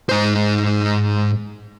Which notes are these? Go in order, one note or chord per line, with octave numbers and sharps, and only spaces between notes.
G#2 C5